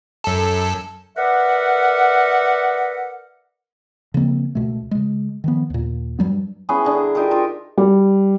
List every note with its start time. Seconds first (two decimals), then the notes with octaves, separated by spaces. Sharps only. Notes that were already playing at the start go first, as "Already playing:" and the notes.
0.24 F#2 A4
1.16 A#4 B4 D5 E5 F#5
4.14 C#3 F3 A#3 C4
4.55 C#2 B2 A3
4.91 C#3 G#3
5.44 D#3 F3 B3
5.70 D#2 A#2
6.19 G2 F#3 G3 B3
6.69 B3 C#4 E4 G#4
6.85 D3 A#5
7.15 D#4 F4 G4 A#4
7.31 F4 G4 A#4
7.78 G3